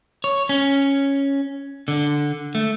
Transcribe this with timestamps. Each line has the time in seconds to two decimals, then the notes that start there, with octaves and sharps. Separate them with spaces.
0.24 C#5
0.49 C#4
1.88 D3
2.55 A3